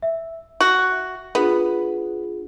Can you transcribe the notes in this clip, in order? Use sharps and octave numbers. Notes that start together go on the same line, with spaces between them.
E5
F#4
B3 D4 F4 G#4